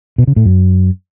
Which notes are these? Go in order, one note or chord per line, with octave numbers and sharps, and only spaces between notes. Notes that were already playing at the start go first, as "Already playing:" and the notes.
B2
C#3
A2
F#2